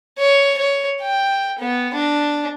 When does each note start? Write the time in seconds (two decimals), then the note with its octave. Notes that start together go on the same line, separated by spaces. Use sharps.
0.18 C#5
0.58 C#5
1.01 G5
1.59 B3
1.93 D4